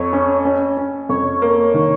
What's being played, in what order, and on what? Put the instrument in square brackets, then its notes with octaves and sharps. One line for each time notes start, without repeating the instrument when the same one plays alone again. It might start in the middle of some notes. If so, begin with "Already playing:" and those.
Already playing: [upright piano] F2 [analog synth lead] C#5
[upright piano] C#4
C#4
C#4
[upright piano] F2 [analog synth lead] C#5
[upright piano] A#3
D#3